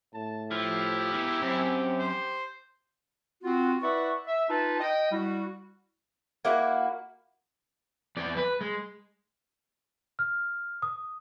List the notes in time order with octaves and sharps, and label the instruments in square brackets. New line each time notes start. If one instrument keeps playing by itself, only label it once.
[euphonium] A2 [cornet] A5
[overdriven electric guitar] F3 [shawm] E4 [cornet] G4
[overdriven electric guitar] B2 E3
[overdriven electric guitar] F#2 [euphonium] C4
[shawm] C5
[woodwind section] C4 F4 F#4
E4 B4 D5 E5 F#5 C#6
E5
D#4 F4 B4 A5
D#5 G5
G3 E4 F#4
[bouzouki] A#3 E4 F#4
[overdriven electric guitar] E2 D5
B4
G#3
[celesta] F6
D#6